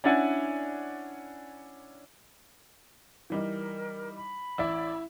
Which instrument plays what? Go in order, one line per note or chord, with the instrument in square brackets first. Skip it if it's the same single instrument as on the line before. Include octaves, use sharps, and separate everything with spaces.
[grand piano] C#4 D4 E4 D5 F#5 G#5
[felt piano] E3 G3 D#4 [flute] A#4
[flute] B5
[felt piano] A1 D5 [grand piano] E4 E5